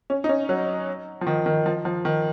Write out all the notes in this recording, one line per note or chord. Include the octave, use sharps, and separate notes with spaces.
C#4
D#4
C#4
F#3
F3
D#3
D#3
F3
F3
D#3